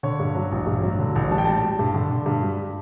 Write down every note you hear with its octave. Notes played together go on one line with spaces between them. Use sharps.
D3 C#5
G2
F#3
A1
G2
F#3
D3
A1
G3 A5
G5
G3 A5
G3
G2
D3
D3
G2
G3